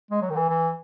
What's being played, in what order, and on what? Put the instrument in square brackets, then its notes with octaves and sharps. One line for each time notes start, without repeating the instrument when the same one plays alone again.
[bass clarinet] G#3
F#3
D#3
E3
E3